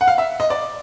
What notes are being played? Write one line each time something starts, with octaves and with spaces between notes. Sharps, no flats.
F#5
F5
E5
D#5
D5